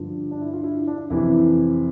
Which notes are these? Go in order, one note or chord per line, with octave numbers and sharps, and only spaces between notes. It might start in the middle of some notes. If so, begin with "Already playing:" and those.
Already playing: G2 D3 F3
D4
E4
F4
E4
D4
F2 C3 E3 E4